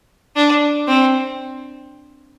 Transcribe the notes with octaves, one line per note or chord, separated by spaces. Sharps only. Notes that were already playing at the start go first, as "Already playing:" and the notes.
D4
C4